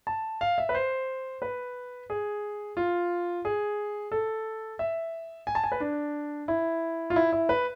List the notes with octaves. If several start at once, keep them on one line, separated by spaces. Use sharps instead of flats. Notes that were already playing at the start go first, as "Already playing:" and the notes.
A5
F5
E5
B4
C5
B4
G#4
F4
G#4
A4
E5
G#5
A5
G#5
B4
D4
E4
F4
E4
E4
B4